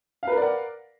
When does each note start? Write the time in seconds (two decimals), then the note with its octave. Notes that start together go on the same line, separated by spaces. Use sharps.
0.23 F5
0.28 B4
0.32 A#4
0.37 D5
0.42 F#5